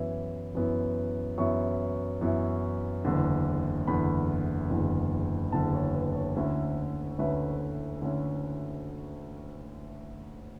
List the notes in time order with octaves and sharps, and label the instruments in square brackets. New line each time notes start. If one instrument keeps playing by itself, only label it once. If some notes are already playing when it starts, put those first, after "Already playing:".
Already playing: [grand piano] F#2 E3 B3 E4 B5
F#2 E3 B3 E4
F#2 E3 B3 E4 C#6
F#2 E3 B3 E4
F#1 E2 D3
F#1 E2 D3 B5
F#1 E2 D3
F#1 E2 D3 A5
C#5
B4
C#5
D2 D3 A3 C#4 E4
D2 D3 A3 C#4 E4 B4
D3 A3 C#4 E4